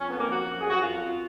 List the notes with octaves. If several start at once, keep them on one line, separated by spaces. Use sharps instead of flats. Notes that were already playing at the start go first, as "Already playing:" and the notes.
F2 C#4
B3
D#3 A#3
F3 F#4
F#2
F#2 G#4
F#4
F#2 F4
F2